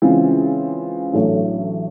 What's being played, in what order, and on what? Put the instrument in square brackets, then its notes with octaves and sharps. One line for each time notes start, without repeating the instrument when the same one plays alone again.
[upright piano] C#3 E3 G#3 C4 F4
A1 A2 F#3 A3 D4